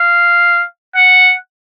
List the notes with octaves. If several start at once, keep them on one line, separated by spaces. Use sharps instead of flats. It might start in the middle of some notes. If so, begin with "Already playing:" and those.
Already playing: F5
F#5